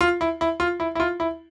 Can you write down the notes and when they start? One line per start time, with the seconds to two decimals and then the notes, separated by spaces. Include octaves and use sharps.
0.01 F4
0.21 E4
0.41 E4
0.60 F4
0.80 E4
0.95 E4
1.00 F4
1.20 E4